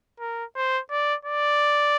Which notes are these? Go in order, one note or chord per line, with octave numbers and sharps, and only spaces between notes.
A#4
C5
D5
D5